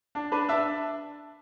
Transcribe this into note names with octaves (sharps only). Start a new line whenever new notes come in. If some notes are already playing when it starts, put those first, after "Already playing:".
D4
D4 B4
D4 E5 A5